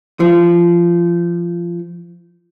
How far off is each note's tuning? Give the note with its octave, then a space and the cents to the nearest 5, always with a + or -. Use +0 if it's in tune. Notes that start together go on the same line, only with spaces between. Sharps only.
F3 -20